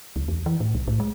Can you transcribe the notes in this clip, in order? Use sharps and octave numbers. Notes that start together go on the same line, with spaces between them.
C#2
E2
E3
A2
C2
A2
G#3